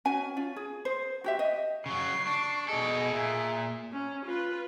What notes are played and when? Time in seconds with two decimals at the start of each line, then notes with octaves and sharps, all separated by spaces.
0.05 C#4 F#4 G#5
0.37 C#4 F4
0.56 G#4
0.85 C5
1.24 F#4 G4 E5
1.39 D#5
1.86 C#3 F#3 C#6 C7
2.27 D4
2.68 B2 G#4 A4 D#5
3.13 A#2 E5
3.92 C#4
4.25 F4 B4